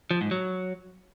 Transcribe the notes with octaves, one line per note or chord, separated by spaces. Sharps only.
F3
G#2
F#3